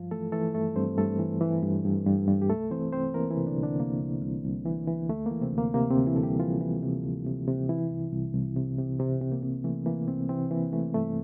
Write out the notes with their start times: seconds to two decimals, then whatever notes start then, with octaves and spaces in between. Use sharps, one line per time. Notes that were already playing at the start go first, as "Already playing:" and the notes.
Already playing: G2 F3 F4
0.11 E3 A3 A4
0.32 E3 A3 A4
0.54 G2 A3 A4
0.76 G2 C4 C5
0.98 G2 A3 A4
1.19 E3
1.41 E3
1.63 G2
1.85 G2
2.06 G2
2.28 G2
2.42 G4
2.49 C2 A3 A4
2.71 E3 C4 C5
2.93 C2 C4 C5
3.14 E3 A#3 A#4
3.30 E3 E4
3.36 C3
3.47 D3 D4
3.58 C2
3.63 D3 D4
3.80 C3 A#3
4.01 C2
4.23 C2
4.44 C2
4.66 E3
4.87 E3
5.09 D2 A3
5.26 A#3
5.31 E3
5.41 C3 C4
5.53 D2 A#3
5.74 C3 A#3
5.90 C3 C4
5.96 D2
6.07 E3 E4
6.16 D2 A4
6.23 G3 G4
6.39 E3 F3 F4
6.61 E3
6.83 C3
7.04 D2
7.26 C3
7.48 C3
7.69 E3 E4
7.91 C2
8.12 C2
8.34 C2
8.56 C3
8.78 C3
8.99 C3 C4
9.21 C3
9.32 A#3
9.43 C3
9.64 E3 A3
9.86 E3 A#3
10.08 C2 C3 C4
10.29 C3 E3 C4
10.51 E3 A#3
10.73 E3 A3
10.94 G2 A3